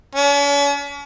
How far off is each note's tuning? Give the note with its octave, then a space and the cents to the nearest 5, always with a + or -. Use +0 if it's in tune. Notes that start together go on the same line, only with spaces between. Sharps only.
C#4 +45